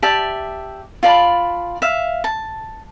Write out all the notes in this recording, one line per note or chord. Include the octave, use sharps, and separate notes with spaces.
G4 D5 E5 A5
F4 D5 A5 B5
E5 F5
A5